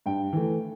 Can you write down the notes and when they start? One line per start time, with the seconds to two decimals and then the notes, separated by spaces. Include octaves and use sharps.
0.06 G2 G5
0.33 E3 A3